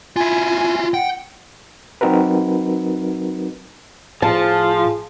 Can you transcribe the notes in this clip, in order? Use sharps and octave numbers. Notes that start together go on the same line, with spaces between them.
E4 F4 G#5
F#5 G5
F#3 C4 D#4 F#4 A#4 B4
A2 F3 G#4 A5